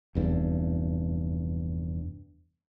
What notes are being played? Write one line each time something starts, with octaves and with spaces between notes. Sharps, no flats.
F1 E2 G2